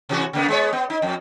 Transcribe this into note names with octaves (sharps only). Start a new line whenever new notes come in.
C3 E3 F#4
C#3 A#3 B3
G#3 B3 C#5
B3
D#4
F2